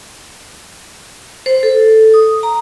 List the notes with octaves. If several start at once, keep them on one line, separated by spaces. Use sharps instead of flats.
C5
A4
D#6
A#5